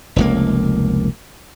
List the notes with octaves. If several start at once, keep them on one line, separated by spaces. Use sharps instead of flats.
F1 C#2 A#3